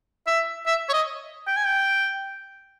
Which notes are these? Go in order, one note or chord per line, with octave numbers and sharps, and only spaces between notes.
E5
E5
C#5
D#5
G5
G#5
G5